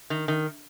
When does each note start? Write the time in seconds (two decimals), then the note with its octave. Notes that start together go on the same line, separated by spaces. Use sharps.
0.10 D#3
0.28 D#3